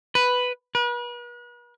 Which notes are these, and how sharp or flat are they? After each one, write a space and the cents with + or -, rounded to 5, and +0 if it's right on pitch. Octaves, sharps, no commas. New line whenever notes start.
B4 +5
B4 -40